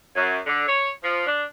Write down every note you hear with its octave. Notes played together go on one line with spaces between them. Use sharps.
F#2
D3
C#5
F3
D4